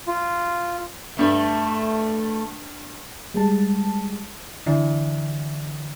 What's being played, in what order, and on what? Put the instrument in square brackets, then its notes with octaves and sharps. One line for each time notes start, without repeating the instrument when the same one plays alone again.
[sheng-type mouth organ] F4
[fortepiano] G2 [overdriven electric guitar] A3
[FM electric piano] G3 G#3 A5
[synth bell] D3 E3